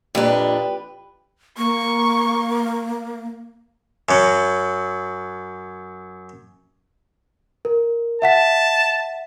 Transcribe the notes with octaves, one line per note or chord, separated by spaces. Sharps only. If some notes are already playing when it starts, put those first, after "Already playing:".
F2 A#2 D4 G4 B4
A#3 C#6
F#2 F#3
A#4
E5 F#5 A5 B6